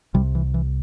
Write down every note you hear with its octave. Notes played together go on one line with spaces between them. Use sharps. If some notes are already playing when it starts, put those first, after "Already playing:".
C2 C3 G3
E3
E3